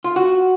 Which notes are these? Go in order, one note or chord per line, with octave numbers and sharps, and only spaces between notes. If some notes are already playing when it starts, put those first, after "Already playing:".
F4
F#4